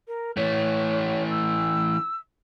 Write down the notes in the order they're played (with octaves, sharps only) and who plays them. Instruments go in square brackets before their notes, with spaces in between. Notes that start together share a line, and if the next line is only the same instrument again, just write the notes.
[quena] A#4
[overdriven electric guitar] E3 A3 [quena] C#5
[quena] E6